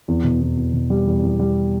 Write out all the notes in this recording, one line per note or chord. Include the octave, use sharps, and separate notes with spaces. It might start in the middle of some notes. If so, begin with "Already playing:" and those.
E2
B2
E2
E2
B2
G3
E2
E2
G3